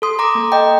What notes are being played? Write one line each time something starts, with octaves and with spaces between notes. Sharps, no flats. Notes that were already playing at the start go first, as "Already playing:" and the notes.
A4 C6 D#6
A#5 D6
A#3
D#5 G5